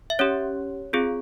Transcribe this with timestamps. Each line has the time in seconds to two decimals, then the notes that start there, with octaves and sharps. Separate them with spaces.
0.10 E5
0.19 C#4 G4 C#5
0.93 C4 F4 G#4